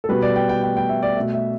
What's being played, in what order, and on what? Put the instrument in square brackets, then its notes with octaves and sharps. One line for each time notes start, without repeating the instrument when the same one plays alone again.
[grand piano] A4
B2 G3 B4
D5
G5
G5
G5
G5
E5
D5
B2 A3 E5
E5